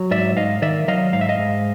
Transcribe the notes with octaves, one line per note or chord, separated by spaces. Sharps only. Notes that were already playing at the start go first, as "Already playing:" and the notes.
Already playing: F#3
G#2 D5 E5
G#2 D#5 F5
D#3 D5 E5
F#3 D#5 F5
G#2 F5
E5
D#5 F5
G#2